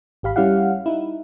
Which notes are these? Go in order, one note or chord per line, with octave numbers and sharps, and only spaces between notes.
G#1 G4 F5 B5
G3 C#4 E4 G4 F5 F#5
D#4 E4